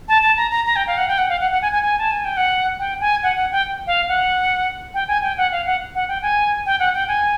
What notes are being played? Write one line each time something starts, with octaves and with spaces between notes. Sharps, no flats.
A5
A5
A#5
A#5
A#5
G5
F5
F#5
G5
F#5
F5
F#5
F#5
G#5
G#5
G#5
A5
G#5
G5
F#5
G5
G#5
F#5
F#5
G5
F5
F#5
G5
G#5
G5
F#5
F5
F#5
F#5
G5
G#5
G5
F#5
G5
G#5